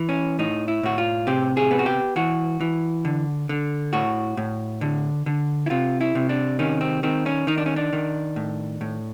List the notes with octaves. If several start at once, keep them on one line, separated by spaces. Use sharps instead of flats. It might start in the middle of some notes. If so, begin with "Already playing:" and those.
Already playing: E3
C#4
A2 D#4
E4
A2 F#4
F4
C3 G4
G#4
B3
F#4
G4
E3 F#4
E3
D3
D3
A2 F#4
A2
D3
D3
E4
C3 F4
E4
C3
D4
D#3 C#4
C4
D#3 C4
C#4
D#3 D#4
D4
C#4
D4
D#3
A2
A2